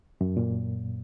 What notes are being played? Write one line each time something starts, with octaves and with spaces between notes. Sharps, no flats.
F#2
A#2